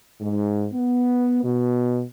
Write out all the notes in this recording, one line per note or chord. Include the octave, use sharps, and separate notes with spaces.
G#2
B3
B2